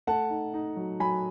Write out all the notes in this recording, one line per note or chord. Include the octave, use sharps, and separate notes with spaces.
A3 F#5 A5
D#4
D#4
F#3
F#3 G#5 B5